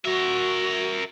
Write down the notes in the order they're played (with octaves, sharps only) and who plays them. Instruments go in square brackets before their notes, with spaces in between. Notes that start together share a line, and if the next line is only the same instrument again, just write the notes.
[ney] F#4 [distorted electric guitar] A#4 E5